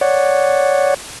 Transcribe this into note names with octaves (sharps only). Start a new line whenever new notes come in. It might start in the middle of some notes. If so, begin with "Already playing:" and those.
C#5 D5 F#5